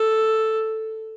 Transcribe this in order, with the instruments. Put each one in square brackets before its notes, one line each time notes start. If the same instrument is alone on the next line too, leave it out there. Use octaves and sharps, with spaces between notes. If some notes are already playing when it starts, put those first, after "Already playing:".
Already playing: [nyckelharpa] A4